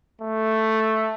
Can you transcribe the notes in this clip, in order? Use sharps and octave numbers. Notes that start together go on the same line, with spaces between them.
A3